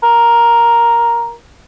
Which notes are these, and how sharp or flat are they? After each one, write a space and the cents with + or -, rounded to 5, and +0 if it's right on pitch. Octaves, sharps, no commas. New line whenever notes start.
A#4 +5